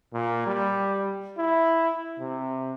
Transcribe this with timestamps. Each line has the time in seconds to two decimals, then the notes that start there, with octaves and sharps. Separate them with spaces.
0.13 A#2
0.46 G3
1.38 E4
2.19 C3